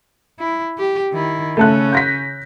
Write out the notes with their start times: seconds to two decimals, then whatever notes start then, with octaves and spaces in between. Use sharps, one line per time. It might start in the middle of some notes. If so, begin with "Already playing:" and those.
0.39 E4
0.78 G4
1.13 D#3 E4
1.57 C#3 A3 C#4 A4 F#6
1.92 G6 A#6 B6